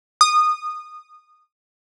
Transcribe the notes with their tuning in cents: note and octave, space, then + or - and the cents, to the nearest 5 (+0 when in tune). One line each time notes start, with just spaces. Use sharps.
D#6 -20